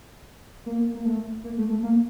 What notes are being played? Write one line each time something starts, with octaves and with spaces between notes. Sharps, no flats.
A#3
A#3
A3
A#3
A3
A3
A#3